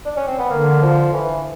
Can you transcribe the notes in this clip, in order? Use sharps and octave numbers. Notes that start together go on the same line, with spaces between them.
D4
C#4
C4
B3
D3 A#3
F3
E3